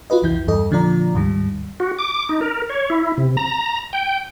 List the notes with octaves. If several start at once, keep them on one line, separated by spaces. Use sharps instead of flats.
F4 F#4 B4 D#5
C2 F2 E3 E4 G6
E2 G2 A4 D#5
A#2 D3 F3 F4 D5 A#5
D2 G#2 D#3 G3
F#4
D6
D#4
A#4
C#5
E4
C3
A#5
G5